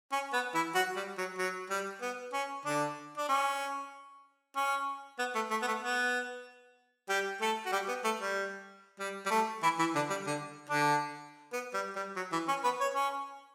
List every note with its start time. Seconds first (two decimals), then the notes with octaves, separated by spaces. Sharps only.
0.12 C#4
0.33 B3
0.54 E3 E4
0.74 F#3 F#4
0.96 G3
1.18 F#3
1.38 F#3
1.70 G3
2.01 B3
2.33 C#4
2.65 D3 D4
3.17 D4
3.29 C#4
4.56 C#4
5.19 B3
5.35 A3
5.51 A3
5.62 B3
5.67 A3
5.82 B3
7.09 G3 G4
7.41 A3 A4
7.65 F#4
7.72 G3 G4
7.88 B3
8.04 A3
8.20 G3
8.99 G3
9.26 G3
9.31 A3
9.63 E3 E4
9.79 E3 E4
9.95 D3 D4
10.10 G3
10.26 D3 D4
10.69 D3 D4
11.53 B3
11.74 G3
11.96 G3
12.16 F#3
12.32 E3
12.48 C#4
12.64 B3 B4
12.80 C#5
12.94 C#4